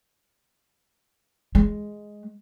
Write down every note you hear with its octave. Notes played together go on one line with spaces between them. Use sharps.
G#3